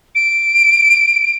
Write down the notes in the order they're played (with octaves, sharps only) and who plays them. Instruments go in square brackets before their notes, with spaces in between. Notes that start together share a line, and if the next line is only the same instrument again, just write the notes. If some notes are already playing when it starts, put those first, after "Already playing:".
[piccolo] D7